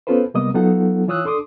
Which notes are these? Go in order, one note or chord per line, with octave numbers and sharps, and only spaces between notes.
B3 C#4 F4 A4 B4 C5
C3 G3 A#3 B3 D#5 D#6
F#3 B3 D#4 F4 A4 F#5
E3 F4 C#5 D#6 E6 F#6
D4 A4 C6 D6 D#6